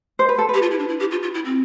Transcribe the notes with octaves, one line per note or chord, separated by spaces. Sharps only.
C5
B4
A4
B4
G4
F4
E4
D4
E4
G4
F4
F4
E4
C4